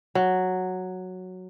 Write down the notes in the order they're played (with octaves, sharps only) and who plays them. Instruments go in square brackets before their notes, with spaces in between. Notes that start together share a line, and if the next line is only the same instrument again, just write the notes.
[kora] F#3